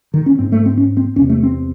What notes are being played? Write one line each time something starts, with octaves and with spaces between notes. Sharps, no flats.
D#3
C#4
G#2 C4
A3
C4
C#4
C4
E2 C3 C#4
A3
C4